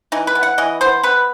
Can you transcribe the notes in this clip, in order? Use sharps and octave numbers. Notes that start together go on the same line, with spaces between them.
E3 D#4
B4
B3
F#5
E3 D#5
B3 C5
B3 B4